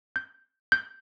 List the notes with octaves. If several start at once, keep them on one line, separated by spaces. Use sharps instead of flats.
G6
G6